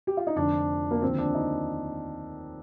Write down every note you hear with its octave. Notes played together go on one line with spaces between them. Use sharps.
G4
F4
D#4
F1 F2 D3 F3 D4
A#3
D#2 D3 F3 C4
D4
D#4